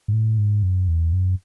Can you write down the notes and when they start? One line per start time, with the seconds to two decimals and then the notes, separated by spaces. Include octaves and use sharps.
0.08 G#2
0.13 A2
0.38 G#2
0.63 F#2
0.88 E2
1.13 F#2